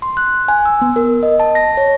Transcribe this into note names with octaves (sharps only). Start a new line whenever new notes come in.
C6
F#6
G#5
E6
B3
A#4
D#5
A5
A#6
C#5